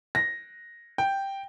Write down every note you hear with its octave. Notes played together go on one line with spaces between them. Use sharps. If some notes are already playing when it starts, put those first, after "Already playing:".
A#6
G5